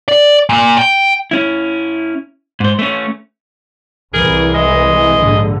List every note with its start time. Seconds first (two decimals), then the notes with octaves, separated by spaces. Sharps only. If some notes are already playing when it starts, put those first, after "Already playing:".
0.08 D5
0.49 A#2
0.78 G5
1.31 C#4 E4
2.60 G#2 C5
2.79 A3 C#4
4.14 C2 E3 G#4 A#4
4.55 G#3 D#5
5.20 A#1 G#2 D3